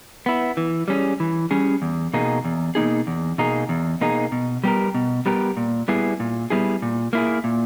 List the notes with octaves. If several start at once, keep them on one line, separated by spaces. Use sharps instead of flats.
B3 E4
E3
G3 C#4 G#4
E3
G3 C#4 G#4
E2
B2 A#3 D#4 G#4
E2
B2 A#3 D#4 G#4
E2
B2 A#3 D#4 G#4
E2
B2 A#3 D#4 G#4
B2
G3 B3 G4 A#4
B2
G3 B3 G4 A#4
A#2
G3 B3 E4 G#4
A#2
G3 B3 E4 G#4
A#2
A#3 E4 G#4
A#2